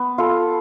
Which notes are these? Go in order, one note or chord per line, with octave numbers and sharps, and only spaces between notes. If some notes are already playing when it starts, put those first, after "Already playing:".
Already playing: B3
F4 A4 F5